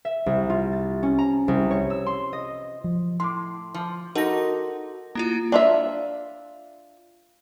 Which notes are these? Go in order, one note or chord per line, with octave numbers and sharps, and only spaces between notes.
E5
C2
F4
A6
C#4
A#5
C2
C#5
E6
C6
D#5
F3
A2 C6 D6
F3
D#4 F#4 A4 A#4 A#6
A#3 E4 F4 A#5
D4 F4 E5